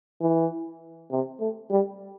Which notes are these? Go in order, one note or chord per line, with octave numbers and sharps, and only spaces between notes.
E3
C3
A3
G3